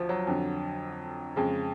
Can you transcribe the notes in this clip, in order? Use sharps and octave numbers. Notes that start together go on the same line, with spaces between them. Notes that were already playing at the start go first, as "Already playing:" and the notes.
Already playing: D2 F3
F#3
F2 D3
F2 C#3 G#3